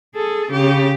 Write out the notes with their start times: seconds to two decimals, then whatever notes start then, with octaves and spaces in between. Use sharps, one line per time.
0.15 G#4 A4
0.52 C#3 G4